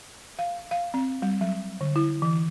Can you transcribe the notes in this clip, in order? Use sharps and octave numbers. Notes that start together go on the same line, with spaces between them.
F5
F5
C4
G3
F#3
D3
E4
E3